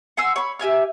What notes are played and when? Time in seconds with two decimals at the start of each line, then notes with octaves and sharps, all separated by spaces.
0.17 F#5 G#5 C6 E6
0.36 C#5 B5
0.59 G4 E5 G#5 F6